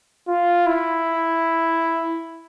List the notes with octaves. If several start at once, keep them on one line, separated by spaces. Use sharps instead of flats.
F4
E4